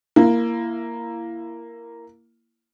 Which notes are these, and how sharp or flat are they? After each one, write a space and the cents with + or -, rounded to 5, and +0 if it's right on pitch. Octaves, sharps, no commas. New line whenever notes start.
A#3 +0 E4 +25